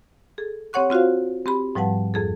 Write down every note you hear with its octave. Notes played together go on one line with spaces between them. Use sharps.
G#4 A4
C4 G4 C#5 F#5 C#6 F#6
C4 F4 F#4 C5 F5
C4 G4 B5
G#2 F3 G3 B4 F#5 A5
F2 G#4 A4